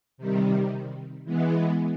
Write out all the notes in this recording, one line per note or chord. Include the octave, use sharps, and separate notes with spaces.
C3 D#3 G3
E3 G#3 B3